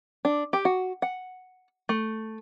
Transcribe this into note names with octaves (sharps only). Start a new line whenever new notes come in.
D4
G4
F#4
F#5
A3